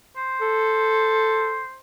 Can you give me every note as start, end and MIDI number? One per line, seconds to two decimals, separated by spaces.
0.17 1.78 72
0.41 1.62 69